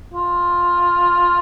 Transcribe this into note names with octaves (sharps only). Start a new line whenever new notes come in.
F4